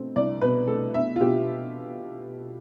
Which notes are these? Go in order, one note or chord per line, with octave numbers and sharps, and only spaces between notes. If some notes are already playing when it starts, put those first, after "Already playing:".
Already playing: B2 A3 C4
C2 D5
B2 B4
A3 A4
B3 E5
F4
B2 G4